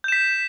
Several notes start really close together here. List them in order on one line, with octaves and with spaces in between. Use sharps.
G6 E7 B6